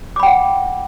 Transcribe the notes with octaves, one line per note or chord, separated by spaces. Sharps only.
F#5 G5 B5 D6